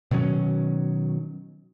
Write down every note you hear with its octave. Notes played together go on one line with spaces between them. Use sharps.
B2 D#3 F#3 C#4